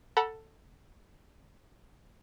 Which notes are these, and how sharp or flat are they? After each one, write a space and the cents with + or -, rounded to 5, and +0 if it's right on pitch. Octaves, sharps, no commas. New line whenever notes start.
A4 +10 F#5 +0 B5 -40